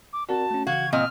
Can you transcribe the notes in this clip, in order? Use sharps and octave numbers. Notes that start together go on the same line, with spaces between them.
D6
C4 F#4 A#4 D5 A5
A3 C#4
C#3 E3 F#4 F5 G#6
A#2 C4 D#5 F6